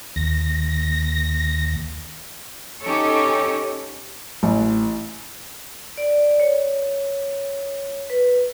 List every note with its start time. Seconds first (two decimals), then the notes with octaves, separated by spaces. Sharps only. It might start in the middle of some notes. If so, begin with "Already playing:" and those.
0.16 D#2 A#6
2.82 C#4 D#4 G4 A4 C#5
4.43 A1
5.98 D5
6.40 C#5
8.10 B4